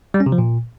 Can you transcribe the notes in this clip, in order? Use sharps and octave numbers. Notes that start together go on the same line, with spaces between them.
G3
C#4
C3
F3
A#2